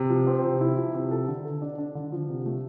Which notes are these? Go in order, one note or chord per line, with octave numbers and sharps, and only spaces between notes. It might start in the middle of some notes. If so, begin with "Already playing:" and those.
Already playing: C3
F3
C4
C3
E4
F3
C3
A4
D3
A4
D4
D4
D3
F3
C3
A3